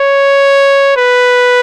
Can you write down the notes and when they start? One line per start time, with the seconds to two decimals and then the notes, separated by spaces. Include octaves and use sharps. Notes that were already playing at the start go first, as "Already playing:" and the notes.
Already playing: C#5
0.97 B4